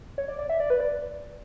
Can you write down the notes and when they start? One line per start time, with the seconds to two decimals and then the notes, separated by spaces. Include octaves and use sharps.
0.18 C#5
0.28 D5
0.39 D5
0.50 E5
0.60 D5
0.70 B4
0.80 D5